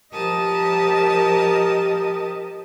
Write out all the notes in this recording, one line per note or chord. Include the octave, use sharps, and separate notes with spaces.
F3 G4 A#4 D#5 A5 D#6